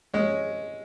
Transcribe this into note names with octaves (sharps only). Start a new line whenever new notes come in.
G#3 C#4